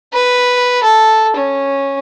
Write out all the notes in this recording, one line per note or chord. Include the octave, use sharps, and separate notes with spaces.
B4
A4
C#4